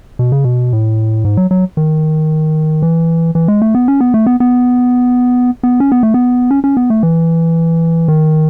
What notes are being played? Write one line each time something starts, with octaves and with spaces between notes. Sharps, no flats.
B2
C#3
B2
A2
G#2
F#3
F#3
D#3
E3
E3
G#3
A3
B3
C#4
B3
A3
B3
B3
B3
C#4
B3
A3
B3
C#4
C#4
B3
A3
E3
D#3